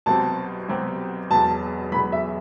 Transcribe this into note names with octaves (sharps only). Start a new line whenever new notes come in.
C2 B2 F#3 C4 G4 A5
C2 B2 F#3 C4 G4
E1 E2 B2 F#3 A5
E1 E2 B2 F#3 B5
E5